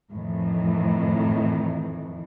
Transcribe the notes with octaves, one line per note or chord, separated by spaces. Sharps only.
F2 A2 D#3 E3